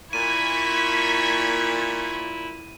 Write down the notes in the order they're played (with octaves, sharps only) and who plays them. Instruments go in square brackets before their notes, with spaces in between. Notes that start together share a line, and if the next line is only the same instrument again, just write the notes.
[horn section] A#2 [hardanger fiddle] E4 [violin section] C#6 G#6 B6 [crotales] D#7